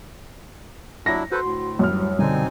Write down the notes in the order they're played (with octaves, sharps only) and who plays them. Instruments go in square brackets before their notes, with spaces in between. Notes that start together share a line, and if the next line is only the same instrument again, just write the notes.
[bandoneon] F#3 D4 E4 [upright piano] A#6
[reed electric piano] F#4 C6 [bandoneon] A4 B4 C5
[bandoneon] D2 A2
[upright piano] F#2 F6
[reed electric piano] G3
[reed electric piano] B2 [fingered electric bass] D3 G3 [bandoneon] C4 D#4 G#5